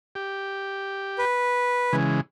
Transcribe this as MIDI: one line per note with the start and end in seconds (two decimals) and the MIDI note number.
0.15 1.25 67
1.19 1.95 71
1.93 2.21 49
1.93 2.21 52
1.93 2.21 56